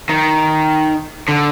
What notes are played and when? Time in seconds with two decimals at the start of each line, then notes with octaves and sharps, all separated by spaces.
0.09 D#3
1.29 D3